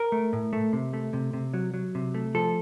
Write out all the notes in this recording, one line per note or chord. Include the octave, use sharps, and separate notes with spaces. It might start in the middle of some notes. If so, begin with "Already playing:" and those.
Already playing: A#4
A3
A2
A3
C3
A3
C3
C3
F#3
F#3
C3
A3
F3 A4